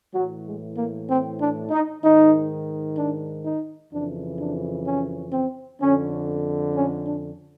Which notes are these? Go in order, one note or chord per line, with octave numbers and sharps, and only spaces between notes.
A2 E3 F#3
G#3
A#3
C4
D4
D#4
G#2 D#3 D#4
D4
D#4
F2 C#3 E3 D4
D4
C#4
C4
F2 D3 C#4
C#4
D4